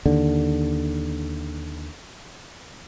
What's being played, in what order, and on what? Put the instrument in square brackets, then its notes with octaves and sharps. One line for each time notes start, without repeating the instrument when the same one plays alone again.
[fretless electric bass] D#2 D3